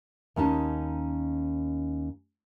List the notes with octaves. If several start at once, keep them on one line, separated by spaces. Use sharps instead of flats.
D#2 C#4 D#4 A5